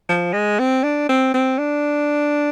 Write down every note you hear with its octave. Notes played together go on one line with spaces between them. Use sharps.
F3
G#3
C4
D4
C4
C4
D4